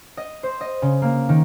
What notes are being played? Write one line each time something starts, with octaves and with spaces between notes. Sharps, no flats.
D#5
C5
D#5
C#3
A#3
D#3